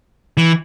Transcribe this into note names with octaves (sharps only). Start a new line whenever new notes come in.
E3